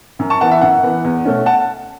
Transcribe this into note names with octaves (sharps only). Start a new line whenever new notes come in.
F#2
A5 C#6
E3 B3 F#5 A5
E5
F#2 F#5
E3 B3
E2
B2 A3 C#4
F#5 A5